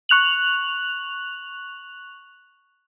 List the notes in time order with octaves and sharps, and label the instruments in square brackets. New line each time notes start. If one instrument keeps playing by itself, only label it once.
[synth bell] C#6 F#6 F7 F#7